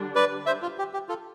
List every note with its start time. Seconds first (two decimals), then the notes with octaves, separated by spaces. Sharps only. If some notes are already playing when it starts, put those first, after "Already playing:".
Already playing: D3 G3 D4
0.15 B4 D5
0.46 C5 E5
0.62 F4
0.79 G4
0.93 G4
1.09 F4 A4